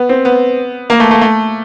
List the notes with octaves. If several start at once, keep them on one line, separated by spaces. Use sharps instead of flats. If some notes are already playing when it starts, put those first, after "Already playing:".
Already playing: B3
C4
B3
A#3
A3
A3
A3